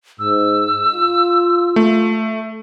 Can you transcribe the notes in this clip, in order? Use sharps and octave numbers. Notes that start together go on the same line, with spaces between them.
G#2 E6
F4
A3